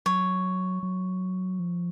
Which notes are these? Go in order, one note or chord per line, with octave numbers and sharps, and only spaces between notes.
F#3 C#5
F#3
F3